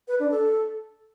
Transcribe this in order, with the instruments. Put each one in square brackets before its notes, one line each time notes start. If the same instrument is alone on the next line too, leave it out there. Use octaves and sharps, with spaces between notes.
[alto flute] B4
D4
A4